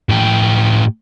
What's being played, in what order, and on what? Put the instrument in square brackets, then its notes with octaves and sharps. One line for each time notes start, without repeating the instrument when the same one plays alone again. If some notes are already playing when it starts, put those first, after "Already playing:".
[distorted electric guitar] A2 G4